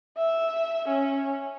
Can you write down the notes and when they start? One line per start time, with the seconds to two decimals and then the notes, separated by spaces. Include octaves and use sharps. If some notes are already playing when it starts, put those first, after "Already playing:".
0.18 E5
0.88 C#4